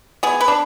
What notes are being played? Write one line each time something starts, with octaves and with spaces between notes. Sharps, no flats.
B3 G#4
B4
D4